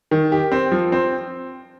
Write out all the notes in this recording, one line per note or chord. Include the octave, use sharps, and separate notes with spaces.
D#3
G4
C4
F3
C4